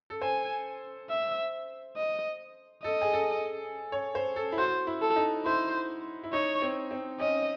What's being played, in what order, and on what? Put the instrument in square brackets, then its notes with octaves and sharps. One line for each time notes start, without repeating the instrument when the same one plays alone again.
[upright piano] A4
[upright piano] C5 [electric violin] G#5
[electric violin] E5
D#5
[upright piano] A4 [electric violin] D#5
[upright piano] G#4
A4
C#5
C5
A4
E4
[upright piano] F#4 [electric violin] C5
[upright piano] E4
[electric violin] A4
[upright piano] D#4
[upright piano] E4 [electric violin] C5
[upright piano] E4
[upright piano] D#4 [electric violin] C#5
[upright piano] C4
C4
[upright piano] C#4 [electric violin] D#5